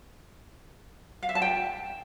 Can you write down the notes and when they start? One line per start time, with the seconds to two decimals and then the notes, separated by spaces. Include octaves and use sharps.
1.23 F5
1.29 E5
1.35 A5
1.42 G5